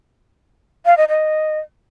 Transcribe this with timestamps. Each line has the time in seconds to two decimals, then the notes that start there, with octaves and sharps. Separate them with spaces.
0.86 F5
0.97 D#5
1.09 D#5